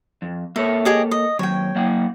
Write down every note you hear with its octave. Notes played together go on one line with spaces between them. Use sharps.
F2
A#3 A4 C#5 E5
G4 G#4 D#5
D#5
D#2 F#3 C#5 G5
F#3 A#3 F#5